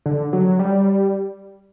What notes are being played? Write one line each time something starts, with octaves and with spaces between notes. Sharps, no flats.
D3
F#3
G3